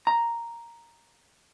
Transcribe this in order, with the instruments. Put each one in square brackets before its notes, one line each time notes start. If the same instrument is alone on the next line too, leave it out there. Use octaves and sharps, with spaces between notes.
[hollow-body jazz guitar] A#5